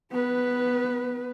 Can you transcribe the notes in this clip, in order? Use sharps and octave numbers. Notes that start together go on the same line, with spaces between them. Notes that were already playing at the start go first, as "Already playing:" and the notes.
B3 B4